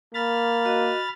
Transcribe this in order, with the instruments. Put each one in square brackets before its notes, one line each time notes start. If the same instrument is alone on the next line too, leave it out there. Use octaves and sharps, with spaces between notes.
[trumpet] A#3 [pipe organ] B5 F6 A6
[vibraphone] F#4 D#5